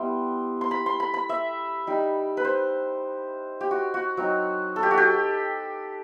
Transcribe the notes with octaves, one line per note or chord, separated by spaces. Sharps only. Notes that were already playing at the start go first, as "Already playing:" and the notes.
Already playing: G3 B3 E4 C6
C6
B5
C6
B5
B5
E5
G3 D#4
B4
C5
G4
F#4
F#4
F#3 C4 D#4
A4
G4
F#4
G4